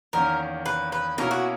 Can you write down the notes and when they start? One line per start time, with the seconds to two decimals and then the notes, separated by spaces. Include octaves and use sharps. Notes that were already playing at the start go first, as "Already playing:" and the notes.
0.13 E2 D#3 A#3 C#4 A#4
0.66 B4
0.92 B4
1.18 B2 A#3 C#4 E4 A#4
1.31 F#4